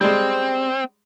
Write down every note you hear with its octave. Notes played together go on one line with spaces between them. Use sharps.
G3 G#3 C4